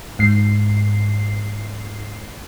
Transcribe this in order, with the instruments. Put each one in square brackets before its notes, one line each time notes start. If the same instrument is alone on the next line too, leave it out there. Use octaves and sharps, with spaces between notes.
[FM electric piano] G#2 C7